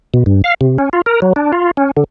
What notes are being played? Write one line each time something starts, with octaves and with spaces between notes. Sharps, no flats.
B2
G2
F5
C3
C#4
F4
A#4
F#3
D4
F4
C#4
D3